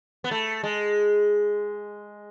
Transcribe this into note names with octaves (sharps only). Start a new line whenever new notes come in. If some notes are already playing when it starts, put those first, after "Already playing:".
B3
A3
G#3